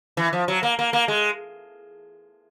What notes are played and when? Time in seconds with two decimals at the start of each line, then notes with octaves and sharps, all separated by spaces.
0.17 E3
0.33 F3
0.48 F#3
0.63 A#3
0.79 A#3
0.93 A#3
1.08 G#3